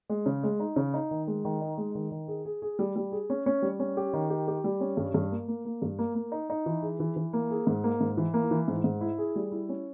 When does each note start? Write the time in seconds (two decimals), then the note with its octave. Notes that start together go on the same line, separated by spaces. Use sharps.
0.09 G#3
0.26 C#3
0.43 G#3
0.60 D#4
0.76 C#3
0.94 D#4
1.11 D#3
1.27 G#3
1.45 D#3
1.61 D#4
1.78 G#3
1.95 D#3
2.11 D#3
2.28 G#4
2.45 G#4
2.62 G#4
2.79 G3
2.96 G3
3.12 G#4
3.30 C#4
3.46 C#4
3.62 G3
3.80 C#4
3.97 G4
4.13 D#3
4.30 G4
4.48 G4
4.64 G3
4.81 C#4
4.97 G2
5.14 G2
5.32 A#3
5.48 A#3
5.65 A#3
5.82 G2
5.99 A#3
6.15 A#3
6.32 D#4
6.50 D#4
6.66 E3
6.83 G#4
7.00 E3
7.16 E3
7.33 A#3
7.51 G#4
7.67 G#2
7.84 A#3
8.01 G#2
8.17 E3
8.34 A#3
8.51 E3
8.68 G#2
8.84 G#2
9.01 E4
9.18 G#4
9.36 G3
9.52 E4
9.69 C#4